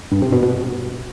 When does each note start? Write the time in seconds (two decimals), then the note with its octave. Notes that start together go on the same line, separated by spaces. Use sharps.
0.12 G2
0.22 C3
0.32 B2
0.43 B2